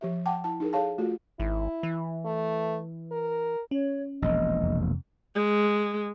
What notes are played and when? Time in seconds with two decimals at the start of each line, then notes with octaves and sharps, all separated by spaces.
0.01 F3 G4 E5
0.26 F#5 G5 A5 D6
0.44 E4 A5
0.60 D#4 G#4 A#4
0.73 G#4 A4 C#5 F5 A5
0.98 A3 F4 F#4 A4
1.40 G#1 E4
1.83 E3
2.25 A3
3.11 A#4
3.71 C#4 C#5
4.22 E1 A#1 D#5
4.63 F2 C3
5.35 G#3